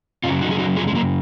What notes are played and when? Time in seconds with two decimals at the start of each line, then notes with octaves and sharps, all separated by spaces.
0.24 F#2 C#3 F#3 C#4 F4
0.41 D#4 F#4
0.51 G#4
0.59 D#4 F#4
0.77 F4 G#4
0.87 G#3
0.95 F#3 A#3